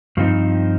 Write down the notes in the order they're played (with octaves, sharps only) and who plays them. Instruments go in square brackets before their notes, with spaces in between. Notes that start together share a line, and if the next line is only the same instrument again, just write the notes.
[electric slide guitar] G2 F3 C4 D#4